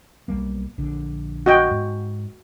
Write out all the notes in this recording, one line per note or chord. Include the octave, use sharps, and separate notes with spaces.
B1 G3 A#3
A#1 D3
F#4 D#5 G5
G#2